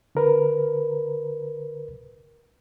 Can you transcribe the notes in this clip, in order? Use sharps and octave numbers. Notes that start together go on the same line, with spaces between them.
D3 A#4 B4